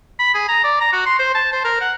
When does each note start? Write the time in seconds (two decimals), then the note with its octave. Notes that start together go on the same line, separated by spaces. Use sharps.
0.19 B5
0.34 G#4
0.48 A#5
0.64 D5
0.81 A#5
0.93 F#4
1.06 C6
1.19 C5
1.34 A5
1.52 C5
1.64 A#4
1.81 F#5